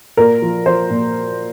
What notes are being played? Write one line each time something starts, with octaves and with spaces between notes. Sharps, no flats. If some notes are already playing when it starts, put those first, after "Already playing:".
A#2 A#4
F3
F3 C5
A#2